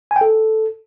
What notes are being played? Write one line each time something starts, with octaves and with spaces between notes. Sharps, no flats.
G#5
G5
A4